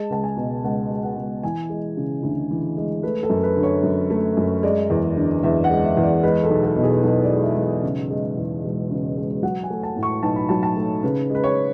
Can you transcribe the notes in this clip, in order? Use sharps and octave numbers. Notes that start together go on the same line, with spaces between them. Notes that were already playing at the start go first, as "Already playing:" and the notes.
Already playing: G#3 A5
C#2 A5
G#5
B2
C#2 F#5
G#3
F#5
C#2
E3 G#5
G#3
C#3
D2
E3
G#3
A3 B4
A4
F#2
B4
D3
C#5
F#2
A3
F#2
G#3 D5
E2
D3
E2 E5
F#5
G#3
E5
E2
D5
G#3 B4
A4
B1
A4
B2
G#4
B1 A4
D5
G#3
E5
B1
E5
C#3
G#3
E2
E1
C#3
G#3
F#3 F#5
G#5
A3
A5
A2
C#6
B1 A5
B5
F#3 A5
A5
A3
C#3 B4
G#3
B4
C#5